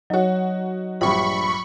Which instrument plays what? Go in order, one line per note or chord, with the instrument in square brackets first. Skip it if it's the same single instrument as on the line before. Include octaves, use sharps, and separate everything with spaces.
[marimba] F#3 C#5 [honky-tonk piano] D#4 F#4
[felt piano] A#1 G2 [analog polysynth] B5 C#6